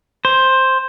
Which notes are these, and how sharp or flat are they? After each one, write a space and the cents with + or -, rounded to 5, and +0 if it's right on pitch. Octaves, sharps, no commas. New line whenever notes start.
C5 +5